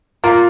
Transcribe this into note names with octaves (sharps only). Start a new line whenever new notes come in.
A#3 F4